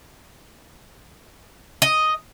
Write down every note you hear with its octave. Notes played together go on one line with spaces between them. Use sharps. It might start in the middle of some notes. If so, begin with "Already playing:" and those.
D#5